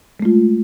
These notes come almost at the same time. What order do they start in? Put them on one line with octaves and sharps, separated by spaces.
G#3 A3 F4